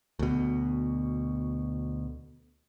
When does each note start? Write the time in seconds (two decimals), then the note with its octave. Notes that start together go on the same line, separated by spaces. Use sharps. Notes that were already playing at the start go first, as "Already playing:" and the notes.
0.19 D2 B2